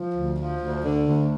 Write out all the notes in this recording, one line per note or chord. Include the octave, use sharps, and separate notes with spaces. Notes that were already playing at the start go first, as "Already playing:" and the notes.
Already playing: F3
D2
F3
D2
D3
D2